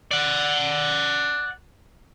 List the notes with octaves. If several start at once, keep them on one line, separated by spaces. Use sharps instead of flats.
D5 F#5